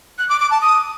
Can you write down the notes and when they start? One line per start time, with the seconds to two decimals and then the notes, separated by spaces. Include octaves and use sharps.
0.18 F#6
0.29 D6
0.40 D6
0.51 A5
0.61 D#6